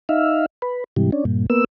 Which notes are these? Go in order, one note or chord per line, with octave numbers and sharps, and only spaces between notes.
D#4 E5 F5
B4
G#2 C3 E3 G3
C#4 D4
G2 A#2
A#3 B3 E6